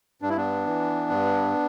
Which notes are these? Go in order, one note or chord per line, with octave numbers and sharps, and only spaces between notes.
G2 D4
E4
B3 D4
E3
G2